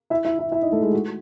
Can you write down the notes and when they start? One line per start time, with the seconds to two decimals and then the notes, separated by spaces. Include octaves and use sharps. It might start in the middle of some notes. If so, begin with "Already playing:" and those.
0.10 E4 E5
0.25 E4 E5
0.39 E4 E5
0.52 E4 E5
0.62 D#4 D#5
0.72 A3 A4
0.82 G#3 G#4
0.93 F#4